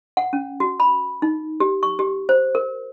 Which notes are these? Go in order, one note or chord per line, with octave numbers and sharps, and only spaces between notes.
F#5
C#4
F#4
B5
D#4
G4
C#6
G4
C5
A#4